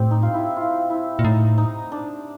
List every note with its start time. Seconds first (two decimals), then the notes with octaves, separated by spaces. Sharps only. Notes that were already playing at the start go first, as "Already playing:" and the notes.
Already playing: A2 C4 G4
0.11 D#4
0.23 F4
0.34 E4
0.56 F4
0.90 E4
1.19 A#2
1.24 A2 D#4
1.58 D#4
1.92 D4